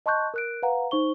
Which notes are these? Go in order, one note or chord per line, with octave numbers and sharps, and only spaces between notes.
D#5 A5 C6 C#6 F#6 G6
A#4 F#6 D7
B4 F5 F#5 A#5
D#4 C5 C#6 G7